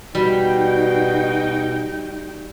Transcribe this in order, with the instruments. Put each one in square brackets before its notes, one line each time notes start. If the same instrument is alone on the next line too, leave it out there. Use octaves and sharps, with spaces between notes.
[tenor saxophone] B2 [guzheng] G3 [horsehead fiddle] D#4 G5 [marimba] F#4